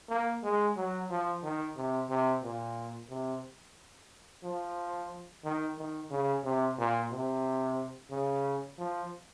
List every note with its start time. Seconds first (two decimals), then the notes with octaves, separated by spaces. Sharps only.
0.09 A#3
0.43 G#3
0.76 F#3
1.10 F3
1.43 D#3
1.77 C3
2.09 C3
2.43 A#2
3.10 C3
4.43 F3
5.44 D#3
5.78 D#3
6.11 C#3
6.44 C3
6.78 A#2
7.11 C3
8.11 C#3
8.78 F3